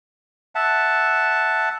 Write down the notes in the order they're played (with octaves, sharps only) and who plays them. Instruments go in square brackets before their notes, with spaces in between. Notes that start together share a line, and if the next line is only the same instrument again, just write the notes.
[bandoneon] E5 F#5 A5